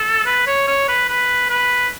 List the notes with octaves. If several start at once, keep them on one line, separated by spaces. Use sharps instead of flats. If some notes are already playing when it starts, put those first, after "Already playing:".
Already playing: A4
B4
C#5
C#5
B4
B4
B4